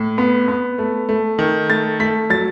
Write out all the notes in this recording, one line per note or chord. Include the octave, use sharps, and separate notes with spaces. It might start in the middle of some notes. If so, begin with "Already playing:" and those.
Already playing: A2
B3
B3
A3
A3
D#3
A3 A6
A3 B6
F#3 A6